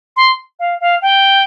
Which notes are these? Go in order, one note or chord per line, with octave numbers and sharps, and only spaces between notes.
C6
F5
F5
G5